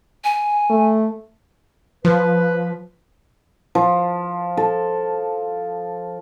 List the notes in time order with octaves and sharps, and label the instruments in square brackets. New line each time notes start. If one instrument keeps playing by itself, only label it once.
[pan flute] G#5
[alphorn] A3
[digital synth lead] F3 [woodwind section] B4
[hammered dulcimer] F3
A4